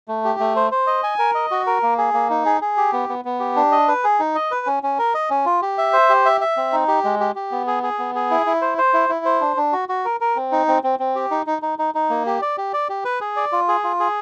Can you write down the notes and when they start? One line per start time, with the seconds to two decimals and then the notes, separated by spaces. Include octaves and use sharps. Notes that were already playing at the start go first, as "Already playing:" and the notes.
0.08 A3
0.24 G4
0.40 A3
0.56 C5
0.72 C5
0.87 D#5
1.03 G#5
1.19 A#4
1.35 D#5
1.51 F#4
1.67 A#4
1.82 A#3
1.98 G#4
2.14 A#3
2.30 D#4
2.45 G#4
2.61 G#4
2.77 G4
2.93 B3
3.09 B3
3.25 B3
3.40 G4
3.56 D4
3.72 D#5
3.88 B4
4.04 G#4
4.20 D#4
4.35 D#5
4.51 B4
4.67 C#4
4.83 C#4
4.98 A#4
5.14 D#5
5.30 C#4
5.45 F4
5.62 G4
5.78 E5
5.93 C5
6.09 G4
6.25 E5
6.41 E5
6.57 C4
6.72 D#4
6.88 G4
7.04 G#3
7.20 G4
7.35 G4
7.52 B3
7.67 G#4
7.83 G#4
7.99 B3
8.15 G#4
8.31 E4
8.46 E4
8.62 C5
8.78 C5
8.93 E4
9.09 E4
9.25 C5
9.41 D4
9.57 D4
9.73 F#4
9.89 F#4
10.05 A#4
10.21 A#4
10.36 C4
10.52 D#4
10.68 C4
10.83 C4
10.99 C4
11.15 G4
11.31 D#4
11.47 D#4
11.62 D#4
11.79 D#4
11.94 D#4
12.10 A#3
12.26 G4
12.42 D5
12.58 G4
12.73 D5
12.89 G4
13.05 B4
13.21 G#4
13.36 D5
13.52 F4
13.68 G#4
13.84 F4
14.00 G#4